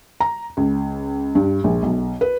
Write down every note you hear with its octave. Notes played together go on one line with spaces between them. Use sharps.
A#5
C#2
G2
A#1
B1
B4